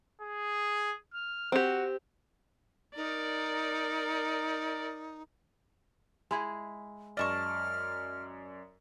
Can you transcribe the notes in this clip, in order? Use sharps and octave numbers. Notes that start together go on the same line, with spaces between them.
G#4
F6
C4 F#4 G4
D#4 A#4 D5
G#3 E4 G#4
F#2 D5 D#5 A5 C#6 F6